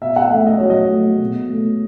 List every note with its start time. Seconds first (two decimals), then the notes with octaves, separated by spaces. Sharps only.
0.01 B2 E5
0.16 F#5
0.31 A3 E5
0.46 D#5
0.58 F#3 C#5
0.70 D#5
0.91 A3
1.20 B2
1.50 A3